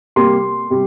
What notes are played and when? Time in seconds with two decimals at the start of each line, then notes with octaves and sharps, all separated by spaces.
0.16 C3 G3 A#3 C6
0.70 C3 G3